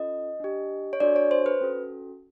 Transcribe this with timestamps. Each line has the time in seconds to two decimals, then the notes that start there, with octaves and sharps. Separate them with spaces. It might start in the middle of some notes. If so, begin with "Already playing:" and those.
Already playing: C#4 F4 A4 D#5
0.40 D4 G4
0.93 C#5
1.00 D4 F#4 A4 D5
1.16 C#5
1.31 C5
1.46 B4
1.61 C#4 F#4 A4